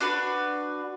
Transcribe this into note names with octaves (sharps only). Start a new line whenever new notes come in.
D4 F#4 B4